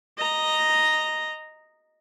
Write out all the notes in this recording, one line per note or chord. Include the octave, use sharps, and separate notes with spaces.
D#5 A#5